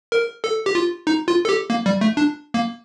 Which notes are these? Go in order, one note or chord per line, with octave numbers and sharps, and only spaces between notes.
A#4
A4
G4
F4
D#4
F4
A4
G4
A#3
G3
A3
D4
A#3